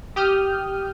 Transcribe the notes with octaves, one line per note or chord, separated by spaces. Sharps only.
G4 D#6 F6 G6